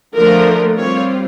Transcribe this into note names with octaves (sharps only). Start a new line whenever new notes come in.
D3 F3 A3 A#4
G3 C4 F4 C#5